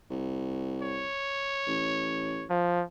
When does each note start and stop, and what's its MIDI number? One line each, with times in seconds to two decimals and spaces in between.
0.10 1.06 36
0.82 2.46 73
1.67 2.47 33
2.49 2.84 53